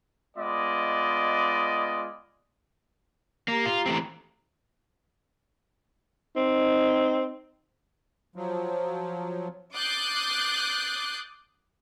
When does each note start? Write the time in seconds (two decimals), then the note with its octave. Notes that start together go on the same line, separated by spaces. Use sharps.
0.37 G#3 B3 F4 D5 D#5
3.48 A#3 G4 A#5
3.66 F4
3.86 E3 A3 C4
6.36 C4 D#4
8.36 F3 F#3
9.75 D6 D#6 F#6 G6 A6 C7